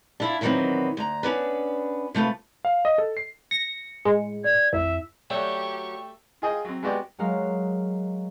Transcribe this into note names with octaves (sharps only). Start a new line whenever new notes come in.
D4 E4 F4
A#2 D#3 E3 F#3 B3 C4
D2 A#5
B3 C#4 D4 B4
C3 A3 F4 B4
F5
D#5
A4
C7
A#6 C#7
A2 G#3
D5 G#6
A1 F2 E4 E5
F#3 A3 G4 G5 C#6
F4 G#4 D#5 G5
F#3 C4
G#3 B3 F#4 G4 D5 G5
F#3 G#3 F#4 A#4 F5